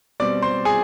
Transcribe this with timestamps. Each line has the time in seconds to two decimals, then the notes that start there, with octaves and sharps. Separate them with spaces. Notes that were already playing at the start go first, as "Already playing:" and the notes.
0.20 B2 G3 C4 D5 D6
0.42 C5 C6
0.65 G#4 G#5